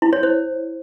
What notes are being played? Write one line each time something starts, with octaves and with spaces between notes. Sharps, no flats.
E4
C#5
C5